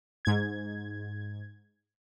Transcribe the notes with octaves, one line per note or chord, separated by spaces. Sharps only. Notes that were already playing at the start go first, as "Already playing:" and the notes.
G#2 G#6